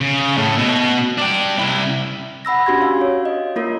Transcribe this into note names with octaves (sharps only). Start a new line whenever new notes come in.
C#3
A2
B2
D4 G5
C2 E4
F#5 B5 E6 A#6
C#4 D4 F#4 G4 C6 G#6
F5
C#5
D#5
A#3 F4 A#4